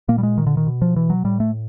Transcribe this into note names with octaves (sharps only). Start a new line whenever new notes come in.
A#2 A#3
G3
G#3
D#3
D3
D#3
B2
F3
E3
F#3
A2 G3
A3